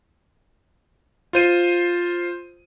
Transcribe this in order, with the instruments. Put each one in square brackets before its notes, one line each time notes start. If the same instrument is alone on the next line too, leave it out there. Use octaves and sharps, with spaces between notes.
[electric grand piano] F4 C5 D#7